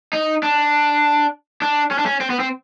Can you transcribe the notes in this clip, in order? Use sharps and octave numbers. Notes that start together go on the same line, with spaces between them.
D#4
D4
D4
C#4
D4
C#4
C4
B3
C4